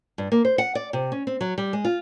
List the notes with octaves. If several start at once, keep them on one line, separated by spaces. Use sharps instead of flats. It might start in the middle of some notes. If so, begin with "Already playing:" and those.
G2
A#3
C5
F#5
D5
C3
C#4
C4
F#3
G3
G#3
F4